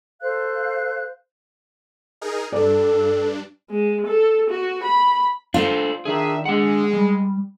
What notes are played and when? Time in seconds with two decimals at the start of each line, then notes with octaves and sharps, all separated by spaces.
0.21 A4 C5 F5 F#6
2.21 D#4 G#4 A#4
2.52 G2 D4 A4 D5
3.71 G#3
4.07 A4
4.50 F#4
4.84 B5
5.54 D4 F4 A4 C5
6.05 D#3 D4 G#4 E5
6.46 G#3 D4 F#5
6.93 G3